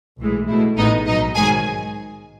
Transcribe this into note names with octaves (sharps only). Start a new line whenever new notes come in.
B1 A2 E3 G#3
B2 A3 E4
A1 A2 G#3 B3 D#4 D#5
B1 B2 F#3 D#4 D#5
G#2 D#3 F#3 G#4 G#5